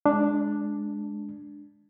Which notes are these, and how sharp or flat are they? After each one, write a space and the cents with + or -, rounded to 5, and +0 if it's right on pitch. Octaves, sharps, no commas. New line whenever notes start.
G#3 +5 D4 +0